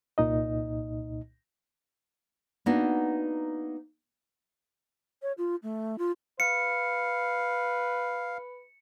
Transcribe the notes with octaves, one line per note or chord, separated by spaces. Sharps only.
C2 A#2 D#4 D#5
A#3 B3 D4 D#4 F#4
C#5
F4
A3
F4
B4 F5 C#7